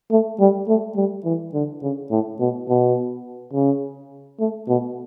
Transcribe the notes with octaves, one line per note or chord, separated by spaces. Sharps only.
A3
G3
A3
G3
E3
D3
C#3
A2
B2
B2
C#3
A3
B2